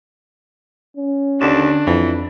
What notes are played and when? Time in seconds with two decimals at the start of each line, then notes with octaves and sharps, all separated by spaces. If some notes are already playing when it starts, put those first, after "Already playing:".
0.97 C#4
1.41 D#2 D3 D4 E7
1.87 F2 E3